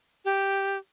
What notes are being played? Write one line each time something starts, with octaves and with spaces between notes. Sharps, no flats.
G4